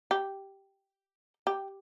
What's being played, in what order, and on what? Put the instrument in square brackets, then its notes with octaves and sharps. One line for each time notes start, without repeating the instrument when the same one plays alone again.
[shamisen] G4
G4